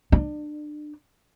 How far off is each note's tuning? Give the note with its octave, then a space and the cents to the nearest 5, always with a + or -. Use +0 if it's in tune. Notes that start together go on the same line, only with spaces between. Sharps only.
D4 +30